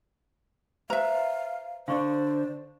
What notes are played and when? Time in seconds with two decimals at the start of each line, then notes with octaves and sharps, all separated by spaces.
0.90 B4 C5 E5 F5 A#5
1.88 D3 D4 C5 F5 C6 C#6